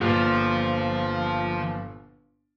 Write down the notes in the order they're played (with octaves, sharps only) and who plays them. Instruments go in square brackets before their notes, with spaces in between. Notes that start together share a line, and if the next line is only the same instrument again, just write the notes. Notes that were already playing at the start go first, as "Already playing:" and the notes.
[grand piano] G1 A#2 [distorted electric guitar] F3